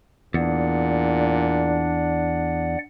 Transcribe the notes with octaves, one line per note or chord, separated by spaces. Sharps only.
E2 A#2 D4 D5 F#5